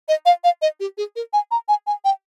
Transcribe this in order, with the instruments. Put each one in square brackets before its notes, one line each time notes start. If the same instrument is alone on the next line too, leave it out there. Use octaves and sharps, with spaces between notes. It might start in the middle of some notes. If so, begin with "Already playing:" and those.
[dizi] D#5
F5
F5
D#5
G4
G#4
A#4
G#5
A#5
G#5
G#5
G5